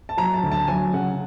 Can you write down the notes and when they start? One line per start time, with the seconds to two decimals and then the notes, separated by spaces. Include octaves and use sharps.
0.09 A5
0.17 F#3 A#5
0.34 A5
0.43 D2
0.52 A5
0.68 F#3 G#5
0.93 C#3 F#5